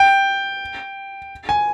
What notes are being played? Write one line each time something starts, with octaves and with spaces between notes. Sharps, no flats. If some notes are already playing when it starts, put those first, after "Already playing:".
Already playing: G5
G#5